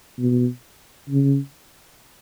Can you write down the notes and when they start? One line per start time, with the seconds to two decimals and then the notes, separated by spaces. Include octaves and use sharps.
0.19 B2
1.09 C#3